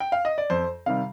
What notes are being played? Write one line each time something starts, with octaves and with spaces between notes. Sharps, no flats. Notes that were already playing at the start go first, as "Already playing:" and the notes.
G5
F5
D#5
D5
F2 C5
C3 D#3 G3 F5